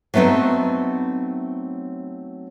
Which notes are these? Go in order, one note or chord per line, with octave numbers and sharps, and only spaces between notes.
F#3 A3 B3 C4 D#4